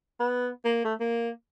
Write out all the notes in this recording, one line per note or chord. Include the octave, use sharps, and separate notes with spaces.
B3
A#3
A3
A#3